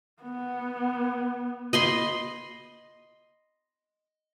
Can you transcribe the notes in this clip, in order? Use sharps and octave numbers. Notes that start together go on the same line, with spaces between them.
B3
D#5 B5 C6